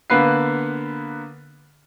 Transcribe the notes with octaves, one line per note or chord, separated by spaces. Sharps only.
D3 A#3 B3 B4 F#6 C7